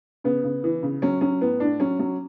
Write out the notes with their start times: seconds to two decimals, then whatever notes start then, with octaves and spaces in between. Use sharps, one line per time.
0.24 C#3 B3
0.44 C#3
0.64 E3
0.83 C#3
1.02 F#3 C#4
1.21 F#3 C#4
1.41 A2 B3
1.60 A2 D4
1.80 F#3 C#4
1.99 F#3